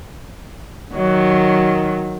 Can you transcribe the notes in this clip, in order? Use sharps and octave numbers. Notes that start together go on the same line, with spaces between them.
D#3 F#3